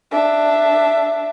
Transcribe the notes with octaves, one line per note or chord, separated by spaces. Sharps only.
D4 E5